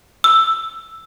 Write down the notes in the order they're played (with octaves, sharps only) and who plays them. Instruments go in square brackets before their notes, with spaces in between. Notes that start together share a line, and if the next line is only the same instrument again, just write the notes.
[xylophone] E6